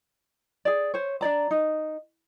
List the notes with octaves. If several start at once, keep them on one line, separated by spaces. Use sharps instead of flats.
G#4 D5
C5 C#5
D4 C#5 D5 A#5
D#4